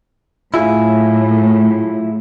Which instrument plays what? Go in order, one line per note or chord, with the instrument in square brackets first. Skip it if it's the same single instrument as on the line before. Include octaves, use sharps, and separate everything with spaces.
[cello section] A2 F#3 [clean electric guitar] E4 F4 G#4